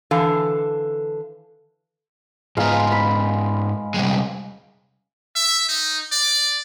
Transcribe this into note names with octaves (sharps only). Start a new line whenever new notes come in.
D3 E3 A4 F5
G#2 G#3 B3 F5 A#5
B5
C3 G3 G#3
E5
D#4
D5